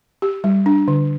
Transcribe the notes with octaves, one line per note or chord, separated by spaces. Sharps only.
G4
G3
D4
D3